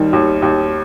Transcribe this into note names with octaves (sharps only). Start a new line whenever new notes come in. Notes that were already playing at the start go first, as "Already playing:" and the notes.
Already playing: D#2 D#3 G3
D#2
D#2